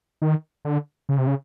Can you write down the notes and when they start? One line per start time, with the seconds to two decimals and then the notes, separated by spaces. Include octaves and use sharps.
0.22 D#3
0.65 D3
1.09 C#3
1.18 C3
1.27 C#3